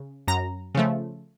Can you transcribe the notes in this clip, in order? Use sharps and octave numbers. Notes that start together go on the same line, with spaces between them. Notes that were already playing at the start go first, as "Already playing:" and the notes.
Already playing: C#3
F#2 A#5
C#3 F3 A3